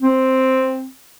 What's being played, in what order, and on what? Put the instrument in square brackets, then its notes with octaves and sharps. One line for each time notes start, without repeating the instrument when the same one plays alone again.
[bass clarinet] C4